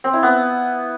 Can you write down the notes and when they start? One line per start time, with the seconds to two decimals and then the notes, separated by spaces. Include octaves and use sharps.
0.04 C4
0.13 E4
0.23 B3